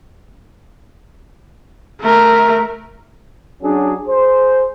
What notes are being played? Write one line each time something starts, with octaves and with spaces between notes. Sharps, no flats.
A3 A#4
F#3 C#4 D4 F#4 G#4
G#4 C5